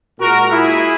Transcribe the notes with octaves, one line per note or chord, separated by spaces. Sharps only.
A#2 G#3 F#4 A#4
E4 G#4